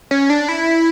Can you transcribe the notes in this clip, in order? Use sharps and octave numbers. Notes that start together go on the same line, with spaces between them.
C#4
D4
E4